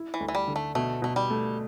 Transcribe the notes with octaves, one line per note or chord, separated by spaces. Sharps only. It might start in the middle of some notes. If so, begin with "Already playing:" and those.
Already playing: E4
E3
D2
E3
G3
D3
A3
B2 A3
B2 A3
G3
A3